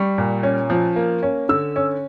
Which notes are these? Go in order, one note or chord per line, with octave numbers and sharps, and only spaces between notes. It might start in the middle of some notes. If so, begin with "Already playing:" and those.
Already playing: G3 C#6
A#2
C#4
F3
A#3
C#4
D3 E6
C#4